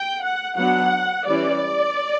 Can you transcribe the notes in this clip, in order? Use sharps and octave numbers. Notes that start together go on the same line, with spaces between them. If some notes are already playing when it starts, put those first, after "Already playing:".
Already playing: G5
F#5
F#3 B3 D4 F#5
E3 G3 C#4 D5